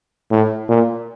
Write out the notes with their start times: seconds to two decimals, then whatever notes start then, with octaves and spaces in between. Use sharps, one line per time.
0.31 A2
0.69 A#2